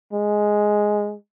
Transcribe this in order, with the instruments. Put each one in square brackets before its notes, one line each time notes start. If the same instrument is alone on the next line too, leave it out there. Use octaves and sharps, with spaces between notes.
[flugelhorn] G#3